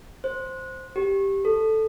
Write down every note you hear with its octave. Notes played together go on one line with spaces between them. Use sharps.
C5
G4
A4